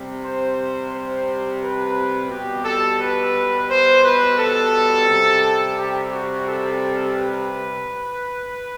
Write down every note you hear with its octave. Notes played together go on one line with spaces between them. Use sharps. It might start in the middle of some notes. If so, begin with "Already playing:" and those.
Already playing: C3 G3
C5
C5
B4
B2 G3 G4
A4
B4
C5
B4
A4
C3 G3
G4
F#4
A4
B4